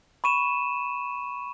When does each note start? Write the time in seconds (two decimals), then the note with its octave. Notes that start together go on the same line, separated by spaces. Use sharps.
0.24 B5 C#6 D#7 E7